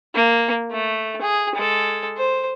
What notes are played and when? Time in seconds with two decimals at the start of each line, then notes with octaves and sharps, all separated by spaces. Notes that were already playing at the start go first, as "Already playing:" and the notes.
0.15 A#3
0.71 A3
1.21 G#4
1.55 G#3 A4
2.17 C5